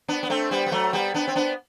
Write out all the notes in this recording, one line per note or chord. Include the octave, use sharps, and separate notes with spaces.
B3 D4
B3
A3 C4
G3 B3
B3
F#3 A3
G3 B3
B3 D4
C4
B3 D4